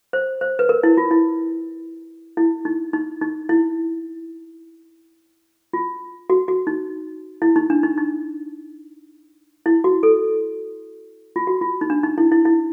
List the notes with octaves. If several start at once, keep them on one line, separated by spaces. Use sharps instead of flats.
C5
C5
B4
A#4
E4
F4
E4
E4
D#4
D#4
D#4
E4
F4
F#4
F#4
D#4
E4
D#4
D4
D#4
D#4
E4
F#4
A4
F4
F#4
F4
D#4
D4
D#4
E4
E4
E4